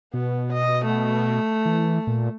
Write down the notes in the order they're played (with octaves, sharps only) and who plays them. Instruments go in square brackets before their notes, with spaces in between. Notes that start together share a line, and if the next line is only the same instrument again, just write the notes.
[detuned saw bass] B2 [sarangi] B3
[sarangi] D#5
A3
[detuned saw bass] E3
A#2